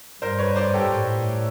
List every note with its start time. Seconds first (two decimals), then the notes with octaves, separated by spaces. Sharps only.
0.22 G2 A#4 C5
0.39 B4 C#5
0.56 C5 D5
0.74 G4 A4
0.91 A2